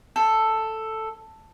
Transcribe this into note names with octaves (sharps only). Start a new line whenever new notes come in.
A4